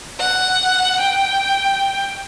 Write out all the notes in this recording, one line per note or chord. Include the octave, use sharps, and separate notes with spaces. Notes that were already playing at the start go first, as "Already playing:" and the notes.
F#5
G5